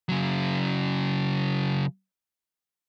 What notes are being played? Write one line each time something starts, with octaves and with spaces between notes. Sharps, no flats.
C#3 F#3